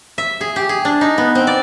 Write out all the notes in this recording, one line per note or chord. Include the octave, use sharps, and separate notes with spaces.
E5
G#4
G4
G#4
D4
D#4
B3
C4
D5